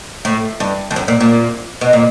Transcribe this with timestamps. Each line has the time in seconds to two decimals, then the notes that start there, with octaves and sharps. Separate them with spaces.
0.25 A2
0.60 G2
0.91 F2
0.96 F#2
1.08 A#2
1.21 A#2
1.81 B2
1.93 A#2